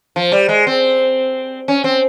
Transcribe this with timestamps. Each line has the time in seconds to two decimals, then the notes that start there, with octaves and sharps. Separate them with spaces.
0.16 F3
0.32 G3
0.49 G#3
0.67 C4
1.68 C#4
1.84 C4